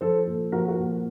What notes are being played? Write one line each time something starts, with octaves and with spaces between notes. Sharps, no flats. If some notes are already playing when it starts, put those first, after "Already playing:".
F3 A4 C5
A#2
F3 F#4 A#4
F#4 A#4
A#2